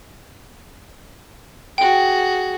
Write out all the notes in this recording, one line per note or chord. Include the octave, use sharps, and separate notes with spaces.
F#4 G#4 G5